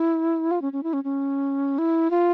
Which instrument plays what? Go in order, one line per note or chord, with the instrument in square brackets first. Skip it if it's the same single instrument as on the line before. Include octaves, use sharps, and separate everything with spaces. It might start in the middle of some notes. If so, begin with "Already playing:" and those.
Already playing: [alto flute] E4
F4
C#4
C#4
E4
C#4
C#4
E4
F4